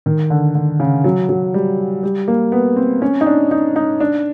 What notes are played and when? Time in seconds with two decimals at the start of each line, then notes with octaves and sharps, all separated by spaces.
0.06 D#3
0.30 D3
0.55 D3
0.80 C#3
1.04 F#3
1.29 F#3
1.54 G3
2.03 G3
2.28 A#3
2.52 B3
2.76 C4
3.02 C#4
3.21 D#4
3.26 D4
3.51 D#4
3.76 D#4
4.00 D4